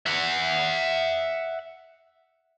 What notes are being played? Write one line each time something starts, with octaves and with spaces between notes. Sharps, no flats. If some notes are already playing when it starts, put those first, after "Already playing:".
E5 F#5